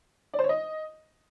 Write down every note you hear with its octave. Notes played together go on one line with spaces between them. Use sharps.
D5
C5
C#5
D#5